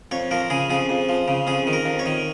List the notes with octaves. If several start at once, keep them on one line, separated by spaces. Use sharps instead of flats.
F2 C#5
F3 A#4
C#3 G#4
F2 G#4
F2
F3
C#3
F2 G#4
D#3
A#4
F2
C#5
D#3